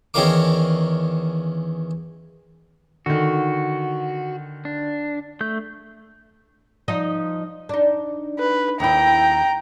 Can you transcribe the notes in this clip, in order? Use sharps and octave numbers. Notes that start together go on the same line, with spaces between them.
E2 D#3 C#4 A#4 F5 D6
D3 D#3 F#4
D4
A3 G6
F3 D#4 D#5
D4 D#4
B4
D#2 E4 G5 A#5